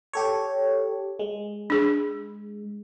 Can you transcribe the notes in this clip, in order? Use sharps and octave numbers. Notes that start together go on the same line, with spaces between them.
G4 A4 C#5
G#3
D4 G#4